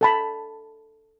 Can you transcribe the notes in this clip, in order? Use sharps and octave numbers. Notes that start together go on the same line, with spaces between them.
A4 A5 B5